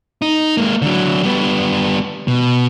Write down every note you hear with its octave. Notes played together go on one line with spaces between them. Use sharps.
D#4
G#3 A#3
D3 F#3
G3 B3
B2